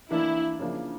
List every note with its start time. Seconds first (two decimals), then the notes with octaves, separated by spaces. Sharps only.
0.10 E3 A#3 D4 E4
0.59 C#3 F3 A#3 D4